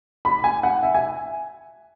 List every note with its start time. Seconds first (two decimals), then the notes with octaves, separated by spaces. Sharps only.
0.25 B5
0.44 G#5
0.63 F#5
0.83 E5
0.95 G#5